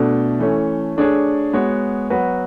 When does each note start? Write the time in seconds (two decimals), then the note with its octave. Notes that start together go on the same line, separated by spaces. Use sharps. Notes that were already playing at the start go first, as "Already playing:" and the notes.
Already playing: B2 A3 D4
0.39 E3 A3 C#4
0.97 A3 D4 G#4 C#5
1.53 G#3 B3 F#4 C#5
2.10 F#3 B3 F#4 B4